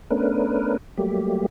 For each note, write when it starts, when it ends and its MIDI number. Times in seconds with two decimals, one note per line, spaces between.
0.10 0.77 57
0.10 0.77 59
0.10 0.77 61
0.10 0.77 62
0.10 0.77 70
0.10 0.77 71
0.97 1.46 54
0.97 1.46 55
0.97 1.46 57
0.97 1.46 58
0.97 1.46 67